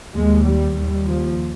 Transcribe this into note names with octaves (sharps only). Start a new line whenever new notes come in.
D#2 G#3
G3
D#2
F3